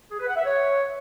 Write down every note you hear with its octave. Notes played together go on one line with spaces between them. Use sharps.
G#4
B4
F#5
E5
C#5